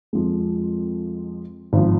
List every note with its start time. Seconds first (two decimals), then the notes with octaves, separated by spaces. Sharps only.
0.13 F2 F3 G#3
1.73 G#1 F3